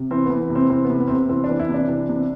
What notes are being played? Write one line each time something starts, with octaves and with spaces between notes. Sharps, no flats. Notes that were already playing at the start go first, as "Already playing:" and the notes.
Already playing: C3
E3 C4
E3 B3
B3
C3
C4
E3 C4
B3
C3
B3
C4
C3 B3
E3 C4
D4
E3
E4
C3 D4
E3
C3